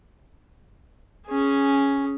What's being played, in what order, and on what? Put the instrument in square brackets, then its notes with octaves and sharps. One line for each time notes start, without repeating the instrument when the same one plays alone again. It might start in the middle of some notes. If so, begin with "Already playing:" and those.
[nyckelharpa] C#4 G#4